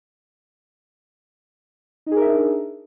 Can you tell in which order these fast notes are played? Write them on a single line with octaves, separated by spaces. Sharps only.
D#4 G#4 A#4 E5 D4